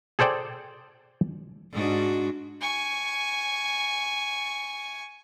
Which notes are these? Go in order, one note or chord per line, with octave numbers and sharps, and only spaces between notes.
G#4 A4 C5 D5 G5
G#2 D4 F#4
G#5 C#6